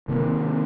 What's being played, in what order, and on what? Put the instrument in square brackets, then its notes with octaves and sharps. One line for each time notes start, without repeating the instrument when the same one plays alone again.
[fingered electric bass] C3 D#3 A#3